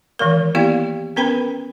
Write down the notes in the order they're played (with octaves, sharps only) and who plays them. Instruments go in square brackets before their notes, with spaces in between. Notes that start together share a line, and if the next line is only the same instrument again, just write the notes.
[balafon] D#3 E3 G#3 A#4
A#3 B3 E4 G4 D5 F5
B3 C#4 A#4 B4 G5 B5